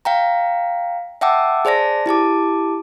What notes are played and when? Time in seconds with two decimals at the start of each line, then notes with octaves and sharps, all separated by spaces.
0.05 F5 G5 A#5
1.21 E5 F#5 G5 A5 D6 E6
1.65 G#4 C5 D5 A5 A#6
2.06 E4 G4 A5 D6